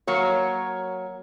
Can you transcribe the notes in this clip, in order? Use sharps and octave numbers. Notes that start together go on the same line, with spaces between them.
F#3 A#3 C#5